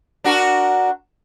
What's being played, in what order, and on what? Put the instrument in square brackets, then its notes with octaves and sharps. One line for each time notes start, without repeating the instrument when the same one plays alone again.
[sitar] D4 F#4 A#4